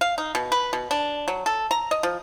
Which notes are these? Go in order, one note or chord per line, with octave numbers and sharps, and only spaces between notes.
F5
D#4
B2
B4
B2
D4
F#3
A4
A#5
D#5
F3